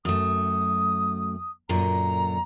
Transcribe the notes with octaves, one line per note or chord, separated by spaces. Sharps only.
F#2 A3 D#6
F#2 A#2 D3 A#5